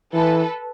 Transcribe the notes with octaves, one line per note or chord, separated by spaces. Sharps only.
E3 A4 B4